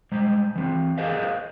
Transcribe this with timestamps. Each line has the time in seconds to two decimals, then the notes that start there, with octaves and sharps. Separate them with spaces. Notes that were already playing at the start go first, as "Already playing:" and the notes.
0.12 G3 G#3 C5
0.55 E3 C4
0.98 G4 G#4 A#4 C5 D#5 F5